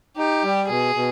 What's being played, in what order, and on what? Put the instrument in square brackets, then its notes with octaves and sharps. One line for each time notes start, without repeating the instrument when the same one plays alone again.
[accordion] D#4 [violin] G4
[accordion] G3
[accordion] B2 [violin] G#4
[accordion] B2